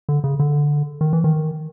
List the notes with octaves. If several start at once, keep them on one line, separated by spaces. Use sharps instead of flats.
D3
C#3
D3
D#3
E3
D#3